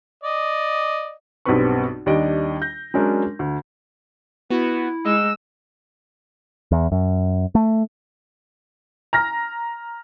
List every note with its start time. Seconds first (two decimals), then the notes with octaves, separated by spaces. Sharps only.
0.23 D5 D#5
1.45 B1 G2 B3 C4 B4 C#6
2.06 D#2 G3 D4 D#5 D7
2.62 G6 A#6
2.94 F#3 G#3 C#4 D4 A#4
3.39 D2
4.50 B3 E4 F#4
5.06 G#3 D#4 E6
6.72 E2
6.92 F#2
7.55 A3
9.13 A#5 F6 A#6